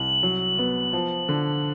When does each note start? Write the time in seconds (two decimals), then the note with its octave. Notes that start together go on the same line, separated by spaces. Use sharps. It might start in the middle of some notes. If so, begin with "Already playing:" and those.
Already playing: C2 F#7
0.23 F#3
0.59 B3
0.93 F3
1.29 D3